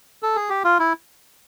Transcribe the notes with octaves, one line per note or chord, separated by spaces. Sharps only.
A4
G#4
G4
F4
E4